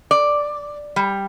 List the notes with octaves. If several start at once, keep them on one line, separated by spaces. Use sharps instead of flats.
D5
G3